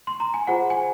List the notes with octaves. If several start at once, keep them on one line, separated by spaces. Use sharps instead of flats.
C6
A#5
G#5
F4 G#4 C5 F#5
G#5